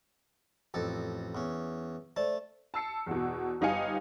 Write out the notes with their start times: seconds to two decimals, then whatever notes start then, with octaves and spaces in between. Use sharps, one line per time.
0.74 A1 F2 A4
1.35 E2 C#4
2.17 A3 C5 D5 A5
2.74 A5 E6 C7 C#7
3.06 E2 B2
3.61 G1 D#4 G4 F5 G#5 C#7